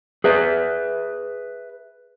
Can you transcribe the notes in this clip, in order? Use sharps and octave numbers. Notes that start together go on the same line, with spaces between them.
G#4 B4 E5